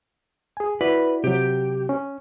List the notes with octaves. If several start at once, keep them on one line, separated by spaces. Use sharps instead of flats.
G#4 G#5
E4 F#4 B4 D5
C3 F#3 G4
C#4